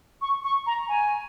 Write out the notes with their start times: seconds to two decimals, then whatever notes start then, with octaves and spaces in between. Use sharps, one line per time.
0.22 C#6
0.44 C#6
0.66 A#5
0.88 G#5